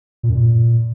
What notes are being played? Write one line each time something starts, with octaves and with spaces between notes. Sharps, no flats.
A#2
F#2
A#2